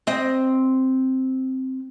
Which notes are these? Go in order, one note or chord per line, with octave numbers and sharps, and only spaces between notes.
C4 D#5